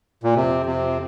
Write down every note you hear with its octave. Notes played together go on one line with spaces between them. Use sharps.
A#2
F2 C3 F3 C4
C3